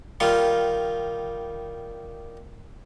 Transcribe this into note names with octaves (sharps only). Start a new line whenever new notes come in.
D#3 G3 F4